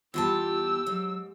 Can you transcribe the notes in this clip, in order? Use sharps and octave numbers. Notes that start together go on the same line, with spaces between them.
E2 G3 F4 G4 A5 E6
G#2 F#3